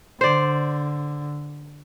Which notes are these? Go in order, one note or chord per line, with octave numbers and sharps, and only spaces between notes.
D3 C5 D5